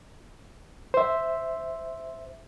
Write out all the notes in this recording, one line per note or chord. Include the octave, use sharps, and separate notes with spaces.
C5 E5